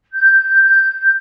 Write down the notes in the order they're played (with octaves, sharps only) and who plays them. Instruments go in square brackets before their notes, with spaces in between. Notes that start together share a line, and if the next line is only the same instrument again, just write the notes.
[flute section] G6